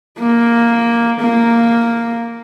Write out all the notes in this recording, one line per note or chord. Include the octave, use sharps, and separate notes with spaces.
A#3
A#3